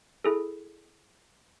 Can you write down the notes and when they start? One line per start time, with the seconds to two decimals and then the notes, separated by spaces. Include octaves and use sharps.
0.24 E4 G#4 A4